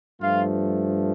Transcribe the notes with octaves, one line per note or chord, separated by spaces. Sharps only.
G2 F3 A3 F4 F5